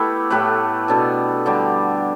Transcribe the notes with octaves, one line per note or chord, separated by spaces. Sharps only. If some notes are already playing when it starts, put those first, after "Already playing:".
Already playing: A3 B3 E4 G4 B4
A2 A3 G4 B4
B2 B3 D4 A4
D3 G3 D4 G4